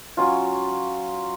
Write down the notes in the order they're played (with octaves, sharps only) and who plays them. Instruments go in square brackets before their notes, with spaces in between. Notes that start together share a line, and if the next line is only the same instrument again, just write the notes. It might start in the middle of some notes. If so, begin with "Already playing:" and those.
[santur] F#3 C#4 F4